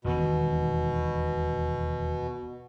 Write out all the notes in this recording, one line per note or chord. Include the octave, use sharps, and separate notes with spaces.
E1 D#2 B2 D#3